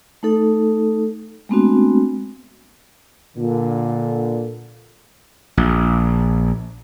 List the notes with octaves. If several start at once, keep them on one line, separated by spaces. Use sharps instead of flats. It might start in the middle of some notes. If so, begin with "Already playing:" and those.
A3 D#4 A4
G#3 A3 B3 C4 D4 F#4
A#2 D3
A#1